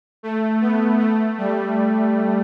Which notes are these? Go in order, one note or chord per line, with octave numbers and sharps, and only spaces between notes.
A3
B3
A3
G3